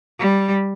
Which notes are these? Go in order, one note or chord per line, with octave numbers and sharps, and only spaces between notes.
G3